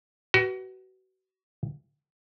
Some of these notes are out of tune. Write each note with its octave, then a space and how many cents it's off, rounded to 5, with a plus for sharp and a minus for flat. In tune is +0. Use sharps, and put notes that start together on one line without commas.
F#4 +30 B4 +0